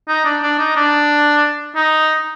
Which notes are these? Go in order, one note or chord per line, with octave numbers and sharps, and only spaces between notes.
D#4
D4
D4
D#4
D4
D#4